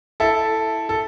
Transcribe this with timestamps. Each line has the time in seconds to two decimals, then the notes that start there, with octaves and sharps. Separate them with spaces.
0.20 E4 A4
0.89 A4